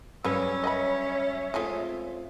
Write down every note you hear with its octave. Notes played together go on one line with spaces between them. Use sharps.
G2 C#3 F#3 C#4 B4 E6
C#5 D#5 E5 G5 B5
G#3 A3 C4 F4 G#4